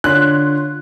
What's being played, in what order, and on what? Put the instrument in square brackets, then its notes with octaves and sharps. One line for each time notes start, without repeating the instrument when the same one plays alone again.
[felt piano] D3 [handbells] F4 C#5 C6 [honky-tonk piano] F#6